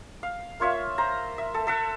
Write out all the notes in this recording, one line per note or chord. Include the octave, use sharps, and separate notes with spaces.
F5
A#3 F4 C#5 E5
C5 A#5
E5
A4
A4 E5 F#5